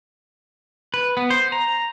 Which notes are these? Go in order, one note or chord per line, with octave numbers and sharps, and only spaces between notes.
B4
B3
C5
A#5